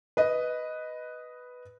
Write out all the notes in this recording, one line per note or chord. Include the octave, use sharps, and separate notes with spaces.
B4 D#5